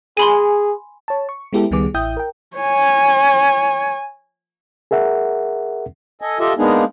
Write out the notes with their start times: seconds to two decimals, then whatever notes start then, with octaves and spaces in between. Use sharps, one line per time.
0.17 G#4 G#5 B5 C6
1.08 C#5 A5
1.29 C#6
1.53 G#3 B3 E4 G4 A4
1.71 C#2 D#3 G3 B3 G#4 D6
1.94 A1 E4 E5 G5 D#6 G6
2.17 A#4 G5
2.56 C#5 G#5
4.91 G#4 A#4 E5 F#5
6.22 A4 D#5 G#5
6.40 F4 G4 A4 D#5 E5
6.58 G#3 A#3 B3 D4 D#4 G#4